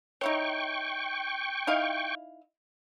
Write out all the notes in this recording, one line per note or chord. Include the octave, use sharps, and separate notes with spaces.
D#4 E4 C#5 G5 C#6
D#4 E4 F5